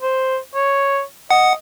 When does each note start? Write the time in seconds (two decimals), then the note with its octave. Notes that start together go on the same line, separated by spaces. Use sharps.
0.02 C5
0.55 C#5
1.31 D#5 F#5